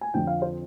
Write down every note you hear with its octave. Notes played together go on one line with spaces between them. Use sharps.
G#5
F2 D3 F3 G5
F5
C5